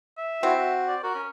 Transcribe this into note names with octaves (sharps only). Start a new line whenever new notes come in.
E5
C4 E4 F#4
F#4
D5
F#4 A#4
C#4